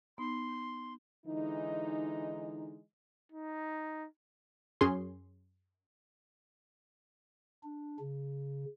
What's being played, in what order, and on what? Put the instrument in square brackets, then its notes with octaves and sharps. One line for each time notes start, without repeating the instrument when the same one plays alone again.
[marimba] B3 D#4 [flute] C6
[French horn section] D3 E3 G#3 D#4
[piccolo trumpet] D#4
[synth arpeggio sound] F#2 C#4 G#4 C6
[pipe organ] D4
C#3